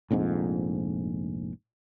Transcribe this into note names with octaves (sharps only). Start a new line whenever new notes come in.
F1 A#1 F2 G#2